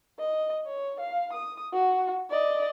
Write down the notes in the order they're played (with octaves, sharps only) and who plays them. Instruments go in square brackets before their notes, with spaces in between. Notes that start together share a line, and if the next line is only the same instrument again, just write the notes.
[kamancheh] D#5
C#5
F5
D#6
F#4
D5 D#5